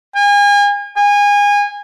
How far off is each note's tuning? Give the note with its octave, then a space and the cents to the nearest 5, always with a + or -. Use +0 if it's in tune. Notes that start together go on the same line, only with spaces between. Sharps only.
G#5 -35
G#5 -25